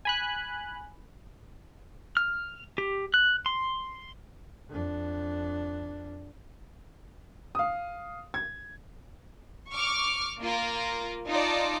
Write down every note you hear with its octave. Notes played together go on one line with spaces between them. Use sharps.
G#5 B5 F#6
F6
G4
F#6
C6
F2 D4
F5 D#6
G#6
C#6 D6 F6
A#3 F4 A#4
D#4 F4 D5 A5